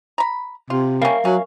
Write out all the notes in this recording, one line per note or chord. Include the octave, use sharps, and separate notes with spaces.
A#5 B5
C3 F4
G3 C#4 A#4 E5 F5
F#3 C#4